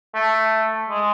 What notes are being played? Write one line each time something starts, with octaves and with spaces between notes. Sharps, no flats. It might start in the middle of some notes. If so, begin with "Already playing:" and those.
A3
G#3